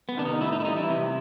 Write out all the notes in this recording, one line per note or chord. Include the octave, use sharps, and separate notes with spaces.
B3
C3 D#3 D4
D#4
A2 E4
D#4
E4
E3 G3 D#4
E4
C3